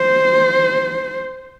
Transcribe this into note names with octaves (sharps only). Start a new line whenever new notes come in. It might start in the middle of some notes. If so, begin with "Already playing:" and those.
Already playing: C5